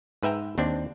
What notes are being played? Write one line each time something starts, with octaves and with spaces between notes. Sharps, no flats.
G#2 B4 E5 G5 A#5
D#2 C4 D4